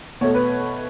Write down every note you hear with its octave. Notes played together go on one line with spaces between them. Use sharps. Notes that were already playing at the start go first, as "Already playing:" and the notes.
B2 A3 C#5
B4